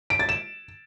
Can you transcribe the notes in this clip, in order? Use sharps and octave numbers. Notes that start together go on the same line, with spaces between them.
D7
A6
E7